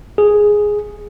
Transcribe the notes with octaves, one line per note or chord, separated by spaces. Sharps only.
G#4